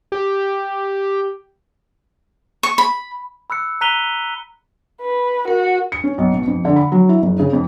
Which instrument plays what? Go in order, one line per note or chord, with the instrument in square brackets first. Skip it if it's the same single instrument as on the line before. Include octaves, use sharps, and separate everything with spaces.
[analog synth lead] G4
[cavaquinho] C#6
B5
[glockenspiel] B5 E6 F#6 C#7
A#5 F#6 B6 D#7 F7 G7
[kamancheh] B4
[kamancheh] F#4 [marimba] A#4
[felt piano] C#7
C#4
B1
B2
F2
D3
B5
F#3
E4
F#1
C#3
F2